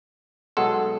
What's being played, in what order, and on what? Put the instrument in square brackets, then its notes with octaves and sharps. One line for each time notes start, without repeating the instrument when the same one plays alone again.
[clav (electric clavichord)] B1 G#3 A4 [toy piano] F#4 F#5 C6